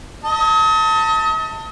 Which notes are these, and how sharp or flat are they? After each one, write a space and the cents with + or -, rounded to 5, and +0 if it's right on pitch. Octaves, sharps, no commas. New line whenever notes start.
D#5 +40 A5 +25